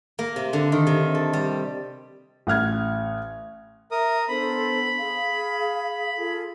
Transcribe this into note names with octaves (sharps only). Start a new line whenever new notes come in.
A#3
C3
D3
D#3
C3
A4
G3
A1 F#5 F6 G#6
A#4 E5 D#6
B3 D4 A4 C5 B5
G#4 F5
F4 G#4 A4